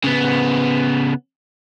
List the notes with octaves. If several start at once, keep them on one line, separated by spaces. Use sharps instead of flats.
C#3 B3